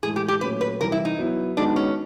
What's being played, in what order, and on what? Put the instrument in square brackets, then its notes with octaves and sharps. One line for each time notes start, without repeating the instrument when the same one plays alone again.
[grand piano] A2 E3 G#3 [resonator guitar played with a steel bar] G#4
[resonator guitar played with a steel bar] G4
G4
[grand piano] A#2 F#3 A3 C#4 [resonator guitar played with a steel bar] B4
[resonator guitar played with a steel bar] B4
[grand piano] C3 E3 G3 [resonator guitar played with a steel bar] A#4
[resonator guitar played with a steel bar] E4
D#4
[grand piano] F#3 B3 E4
[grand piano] D#3 G#3 B3 D#4 F#4 [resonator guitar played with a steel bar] D4
[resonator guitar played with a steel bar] C#4